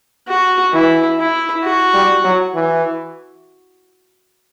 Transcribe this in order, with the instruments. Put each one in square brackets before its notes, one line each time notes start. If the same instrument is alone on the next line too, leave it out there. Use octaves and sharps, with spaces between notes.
[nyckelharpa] F#4
[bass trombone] E3 [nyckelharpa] E4
[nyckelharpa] E4
F#4
[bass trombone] G3
F#3
E3